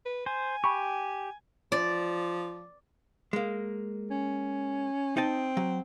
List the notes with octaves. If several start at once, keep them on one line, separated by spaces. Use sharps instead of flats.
B4
C5 G#5
G4 B5 C#6
F3 D5
G#3 A#3
C#4
C4 D#4 D#5 A5
F#3